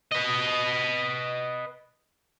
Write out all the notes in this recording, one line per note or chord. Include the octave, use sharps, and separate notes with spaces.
B4 D#5